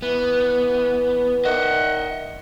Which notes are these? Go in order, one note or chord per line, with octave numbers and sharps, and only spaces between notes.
E3 B3
D#3 D#5 E5 F#5